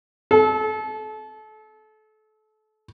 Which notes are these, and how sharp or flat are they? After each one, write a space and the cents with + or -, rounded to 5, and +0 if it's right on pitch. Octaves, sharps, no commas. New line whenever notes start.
A4 -30